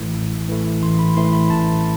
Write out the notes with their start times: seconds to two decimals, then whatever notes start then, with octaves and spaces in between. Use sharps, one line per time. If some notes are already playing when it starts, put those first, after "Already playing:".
Already playing: A1 A2 E3 A3 E4
0.14 A1
0.49 A2 E3 A3 E4
0.82 A1 C6
0.99 B5
1.17 A2 E3 A3 E4 C6
1.33 B5
1.50 A1 A5